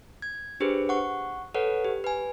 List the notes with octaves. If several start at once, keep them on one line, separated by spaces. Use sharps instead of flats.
G#6
D4 G4 G#4 B4 C5
F#5 C#6
A4 B4 C#5 F#5
G4
B4 G#5